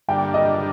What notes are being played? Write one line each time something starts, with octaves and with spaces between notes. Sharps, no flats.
G2 D3 G3 A#3 D4 G5
D#5